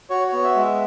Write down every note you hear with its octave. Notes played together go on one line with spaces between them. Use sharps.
F#4 C#5
C#5
B3
E5
G#3
E5